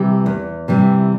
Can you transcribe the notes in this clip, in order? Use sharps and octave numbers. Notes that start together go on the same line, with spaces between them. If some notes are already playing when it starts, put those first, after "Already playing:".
Already playing: C3 E3 G3
E2
C3 E3 G3